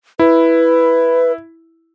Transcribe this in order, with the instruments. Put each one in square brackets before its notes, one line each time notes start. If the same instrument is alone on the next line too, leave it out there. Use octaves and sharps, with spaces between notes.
[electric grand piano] E4 [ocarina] B4